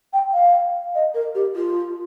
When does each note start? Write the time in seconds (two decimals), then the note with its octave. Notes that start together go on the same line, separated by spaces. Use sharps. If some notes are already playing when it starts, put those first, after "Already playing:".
0.13 G5
0.33 F5
0.95 D#5
1.14 A#4
1.35 G4
1.55 F4